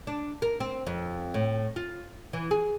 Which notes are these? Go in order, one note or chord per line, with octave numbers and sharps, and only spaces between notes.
D4
A#4
C4
F2
A2
F4
E3
G#4